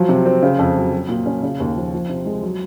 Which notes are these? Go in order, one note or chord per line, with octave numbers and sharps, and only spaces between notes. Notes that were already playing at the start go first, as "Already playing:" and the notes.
Already playing: F3 F#3
C3
C4
C#3
F2
F#3
F#3
A#2
C#4
C#3
D#2
F3
F3
C3
G#3
F#3